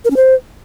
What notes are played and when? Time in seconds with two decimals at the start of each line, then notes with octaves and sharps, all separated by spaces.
0.05 A#4
0.11 C#4
0.16 C5